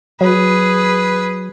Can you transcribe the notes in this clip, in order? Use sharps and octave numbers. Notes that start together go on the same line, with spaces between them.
F#3 G#4 B4